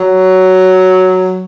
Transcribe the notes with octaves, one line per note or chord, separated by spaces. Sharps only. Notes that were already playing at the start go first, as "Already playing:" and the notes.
Already playing: F#3